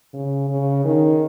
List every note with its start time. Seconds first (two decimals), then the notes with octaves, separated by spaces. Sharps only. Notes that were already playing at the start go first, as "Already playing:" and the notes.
0.14 C#3
0.49 C#3
0.85 D#3